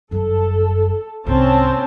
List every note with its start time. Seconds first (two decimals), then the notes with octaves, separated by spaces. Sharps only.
0.11 G1 F#2 A4
1.27 C2 G#2 C4 C#4 A5